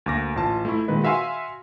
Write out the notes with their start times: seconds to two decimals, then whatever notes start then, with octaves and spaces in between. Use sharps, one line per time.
0.06 D2 A#3 D6 A#6
0.36 A1 F4 A5
0.65 A3 E4
0.88 A#2 D#3 G#3 B4 D#5
1.04 F#4 E5 F5 G#5 C6